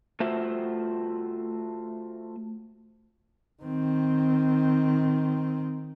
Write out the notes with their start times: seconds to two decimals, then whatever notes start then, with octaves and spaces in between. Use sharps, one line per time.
0.20 A3 F4 F#4 C5 E5
3.63 D#3 C4